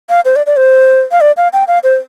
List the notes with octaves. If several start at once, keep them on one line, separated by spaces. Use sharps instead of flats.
F5
C5
D5
D5
C5
F5
D5
F5
G5
F5
C5